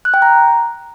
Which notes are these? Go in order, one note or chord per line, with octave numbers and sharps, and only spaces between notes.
F#6
G5
A#5